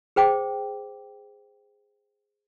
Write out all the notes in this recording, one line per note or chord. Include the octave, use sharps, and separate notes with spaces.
G#4 C5 G5 D6